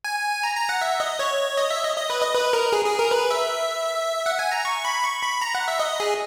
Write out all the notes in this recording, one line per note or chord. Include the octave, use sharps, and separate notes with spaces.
G#5
A#5
A#5
F#5
E5
D#5
C#5
D#5
E5
D#5
D#5
B4
D#5
B4
A#4
G#4
G#4
A#4
B4
E5
F#5
G#5
A#5
C#6
B5
C#6
B5
A#5
F#5
E5
D#5
G#4